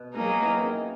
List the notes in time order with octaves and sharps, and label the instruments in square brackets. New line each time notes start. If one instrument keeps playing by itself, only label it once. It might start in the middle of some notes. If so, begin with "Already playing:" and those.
Already playing: [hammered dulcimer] B2
[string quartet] F#3 A#3 D#4 G#4
[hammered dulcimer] E3
D#3
C#3